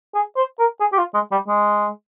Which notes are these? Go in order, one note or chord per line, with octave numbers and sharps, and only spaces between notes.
G#4
C5
A#4
G#4
G4
F4
G#3
G3
G#3